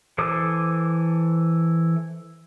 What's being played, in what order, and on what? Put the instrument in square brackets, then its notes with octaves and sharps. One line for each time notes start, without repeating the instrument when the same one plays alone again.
[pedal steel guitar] E3 A4 C5 D6 D#6